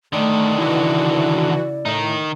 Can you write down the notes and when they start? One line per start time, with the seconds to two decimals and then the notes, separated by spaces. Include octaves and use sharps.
0.13 D3 D#3 A3 D5
0.58 C#3 E3 E4 F#4
1.85 A2 D#3 D#4